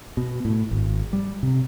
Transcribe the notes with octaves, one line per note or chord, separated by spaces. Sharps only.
B2
A2
G#1
G3
C3